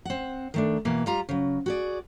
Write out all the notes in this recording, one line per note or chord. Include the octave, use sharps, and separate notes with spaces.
C4 F#5
D#3 A3 D4
B2 E3 A#3 B4
G3 F4 A#5
C#3 F#3
F#4 G#4 D5